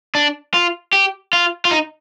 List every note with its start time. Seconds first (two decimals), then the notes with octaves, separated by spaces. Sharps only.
0.15 D4
0.54 F4
0.93 G4
1.33 F4
1.65 F4
1.71 D#4